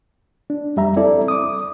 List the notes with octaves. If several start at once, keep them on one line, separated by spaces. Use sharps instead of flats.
D4
F2 G3 E5 A#5
C4 E4 A4 D5
D6 D#6